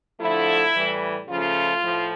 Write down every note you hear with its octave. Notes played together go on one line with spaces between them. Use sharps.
D3 F3 A3 E4
A2 E3 G3
C#3 F3 A3 F4
A2 F3